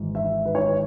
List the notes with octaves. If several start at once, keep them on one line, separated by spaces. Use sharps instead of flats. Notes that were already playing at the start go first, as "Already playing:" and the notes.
Already playing: G#1 G#2 E3
E5
B4
C#5